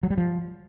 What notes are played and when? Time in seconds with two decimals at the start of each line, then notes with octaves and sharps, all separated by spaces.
0.03 F#3
0.10 G3
0.18 F3